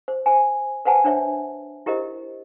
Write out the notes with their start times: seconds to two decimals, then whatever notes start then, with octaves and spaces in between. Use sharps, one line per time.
0.08 C5
0.26 C5 G#5
0.85 B4 C5 F#5 G#5 A5
1.04 D4 C5 C#5 E5
1.86 E4 G4 A#4 C5 D#5